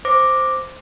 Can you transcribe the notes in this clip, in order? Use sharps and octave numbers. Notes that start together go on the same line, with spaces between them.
C5 D6 A#6